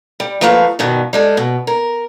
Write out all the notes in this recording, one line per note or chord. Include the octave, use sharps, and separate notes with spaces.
G3
F3 A3 A#3 B4 D#5 F5
G2 B2 D#3
G3 G#3 A4
B2
A#4